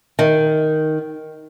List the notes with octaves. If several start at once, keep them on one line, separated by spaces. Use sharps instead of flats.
D#3